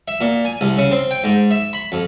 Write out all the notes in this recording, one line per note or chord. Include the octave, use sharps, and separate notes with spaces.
E5
A#2
G#5
C2
C#3
C4
G5
G#2
E5
B5
F2